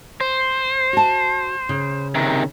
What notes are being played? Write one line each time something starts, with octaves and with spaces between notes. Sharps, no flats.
C5
F#4 A5
C#3
C3 D#3